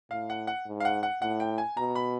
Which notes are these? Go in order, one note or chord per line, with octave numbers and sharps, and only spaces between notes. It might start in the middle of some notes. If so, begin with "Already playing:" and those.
A2 F5
F#5
F#5
G#2
F5
F#5
F#5
A2 F#5
G5
G#5
B2 A#5
B5